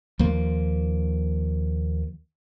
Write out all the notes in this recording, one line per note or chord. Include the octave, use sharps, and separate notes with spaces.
D#2 F3 A#3